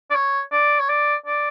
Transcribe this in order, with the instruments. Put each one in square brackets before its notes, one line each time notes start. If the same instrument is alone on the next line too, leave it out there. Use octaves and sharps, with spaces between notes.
[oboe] D5
C#5
D5
C#5
D5
D5